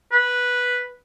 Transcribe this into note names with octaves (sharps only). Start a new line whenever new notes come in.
B4